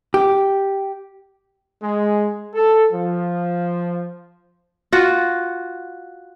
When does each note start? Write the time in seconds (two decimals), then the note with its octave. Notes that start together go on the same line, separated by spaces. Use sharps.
0.14 G4
1.82 G#3
2.55 A4
2.93 F3
4.92 F4 F#4